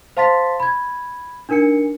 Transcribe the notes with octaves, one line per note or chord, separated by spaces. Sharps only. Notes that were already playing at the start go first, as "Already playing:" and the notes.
C5 F5 A5 C6 A6 B6
B5 G#6
D4 D#4 A#4 G#5 C#7